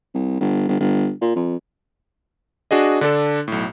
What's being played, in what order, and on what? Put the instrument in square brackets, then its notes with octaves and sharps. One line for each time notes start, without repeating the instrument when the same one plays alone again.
[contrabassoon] C2
G1
G1
G1
A#2
F2
[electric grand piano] D4 F#4 G#4 D#5
D3 D4 A4
B1 A2